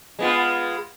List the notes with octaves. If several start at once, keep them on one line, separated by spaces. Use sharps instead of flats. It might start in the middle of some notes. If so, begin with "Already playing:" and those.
G#3 B3 F4